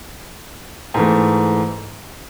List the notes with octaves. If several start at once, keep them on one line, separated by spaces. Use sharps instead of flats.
G#2 E3 A3